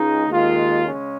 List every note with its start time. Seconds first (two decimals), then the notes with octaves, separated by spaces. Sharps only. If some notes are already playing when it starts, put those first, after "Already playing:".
Already playing: C#2 C#3 G#3 D#4
0.28 D#2 D#3 G#3 F4
0.86 C#3 G#3 C#4